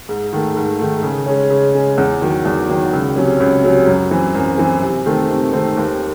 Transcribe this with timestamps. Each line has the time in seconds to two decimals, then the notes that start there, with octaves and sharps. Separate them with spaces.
0.09 G#2
0.33 D#3 A3
0.56 G#2
0.79 D#3 A3
1.03 C#3
1.26 G#3 C#4
1.50 C#3
1.74 G#3 C#4
1.98 E2
2.22 D#3 F#3
2.45 E2
2.69 D#3 F#3
2.93 C#2
3.16 C3 F#3 C#4
3.40 C#2
3.64 C3 F#3 C#4
3.87 F#2
4.11 E3 C4
4.35 F#2
4.58 E3 C4
4.83 C3
5.06 D#3 A3 C4
5.30 C3
5.53 D#3 A3 C4
5.77 D#2